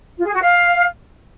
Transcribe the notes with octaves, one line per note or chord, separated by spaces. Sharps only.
F4
G#4
F#4
F5